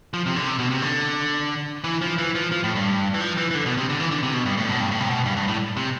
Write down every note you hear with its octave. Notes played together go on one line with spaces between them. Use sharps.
F3
C3
D3
C3
B2
C3
D3
E3
F3
E3
F3
F3
A2
G2
E3
F3
E3
E3
D3
B2
C3
D3
E3
D3
C3
B2
G2
A2
B2
G2
A2
C3
B2
G2
G2
A2
C3